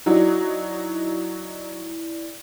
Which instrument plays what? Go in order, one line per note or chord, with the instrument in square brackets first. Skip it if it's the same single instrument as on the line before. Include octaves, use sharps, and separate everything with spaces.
[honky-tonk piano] F#3 D#4 F#4 [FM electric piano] E4 D5